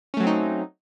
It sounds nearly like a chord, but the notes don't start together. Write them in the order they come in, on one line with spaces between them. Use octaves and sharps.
C#4 A3 F#3 C4 D#4